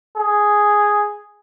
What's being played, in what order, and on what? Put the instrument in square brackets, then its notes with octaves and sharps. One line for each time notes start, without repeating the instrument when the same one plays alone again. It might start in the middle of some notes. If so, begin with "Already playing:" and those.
[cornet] G#4